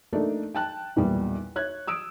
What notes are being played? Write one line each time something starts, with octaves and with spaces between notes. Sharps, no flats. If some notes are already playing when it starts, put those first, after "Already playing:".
A3 A#3 D4 D#4 A4
G5 A5 F#6
B1 E2 A#2 G3
C#5 F#6 G#6
D#6 E6 D7